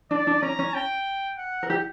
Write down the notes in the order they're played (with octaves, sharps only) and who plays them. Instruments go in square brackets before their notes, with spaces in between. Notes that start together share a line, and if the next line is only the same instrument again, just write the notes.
[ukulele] D4 [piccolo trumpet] D5
[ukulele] D4
[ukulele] C#4 [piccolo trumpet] A#5
[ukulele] C#4
[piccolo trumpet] G5
F#5
[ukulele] A#4
G4